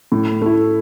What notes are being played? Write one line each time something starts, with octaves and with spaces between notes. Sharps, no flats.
A2
A3 E4